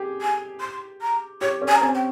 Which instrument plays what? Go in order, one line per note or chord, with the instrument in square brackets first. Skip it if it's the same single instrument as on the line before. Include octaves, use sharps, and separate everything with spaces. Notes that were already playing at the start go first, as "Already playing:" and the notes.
Already playing: [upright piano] G4 G#4
[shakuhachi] G#5
C6
A#5
[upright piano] G4 [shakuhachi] C#5
[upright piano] C#4
[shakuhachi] G#5
A#5
[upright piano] C4 [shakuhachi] G#5
[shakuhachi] G5